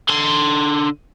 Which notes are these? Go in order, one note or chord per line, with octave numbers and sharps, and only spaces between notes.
D3 C6